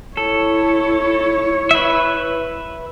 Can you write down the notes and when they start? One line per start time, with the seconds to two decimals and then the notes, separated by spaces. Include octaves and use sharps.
0.17 E4 A4 C#5
1.71 B4 E5